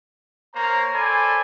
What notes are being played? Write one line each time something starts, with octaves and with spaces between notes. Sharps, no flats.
A#3 C5 C#5 A#5
A4 C5 D5 G#5 B5